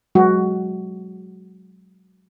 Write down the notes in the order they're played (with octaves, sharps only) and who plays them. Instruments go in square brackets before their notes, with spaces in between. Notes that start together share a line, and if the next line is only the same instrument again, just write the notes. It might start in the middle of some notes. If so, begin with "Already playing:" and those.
[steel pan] F#3 G#3 F#4